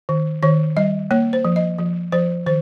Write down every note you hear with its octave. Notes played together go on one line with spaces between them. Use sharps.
D#3
D#3 C#5
G3 D#5
A#3 C#5
C5
F3
D#5
F3
F3 C5
D#3 C5